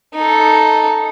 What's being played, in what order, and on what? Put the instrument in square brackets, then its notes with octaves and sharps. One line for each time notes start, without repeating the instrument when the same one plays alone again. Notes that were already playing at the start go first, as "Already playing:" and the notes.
[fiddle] D#4 A4